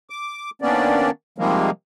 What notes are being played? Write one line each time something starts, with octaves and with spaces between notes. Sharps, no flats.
D6
D#3 A#3 B3 C#4 D4 D5
C3 D#3 F3 G3 G#3 A#3